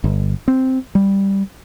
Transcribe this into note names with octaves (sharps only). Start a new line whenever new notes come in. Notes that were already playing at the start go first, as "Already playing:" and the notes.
G1
C4
G3